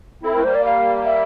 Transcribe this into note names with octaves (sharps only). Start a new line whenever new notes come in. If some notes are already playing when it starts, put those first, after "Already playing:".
C4 E4 A4
A3 A#4
G3 A#3 C5
D5
F5
E5